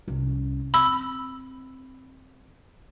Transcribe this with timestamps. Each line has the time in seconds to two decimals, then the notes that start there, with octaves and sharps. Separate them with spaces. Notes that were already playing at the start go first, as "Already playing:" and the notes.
0.08 C2 C#4
0.74 C4 B5 E6